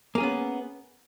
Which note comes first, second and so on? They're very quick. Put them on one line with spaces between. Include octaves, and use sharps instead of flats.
A#3 G#4 C#4 B3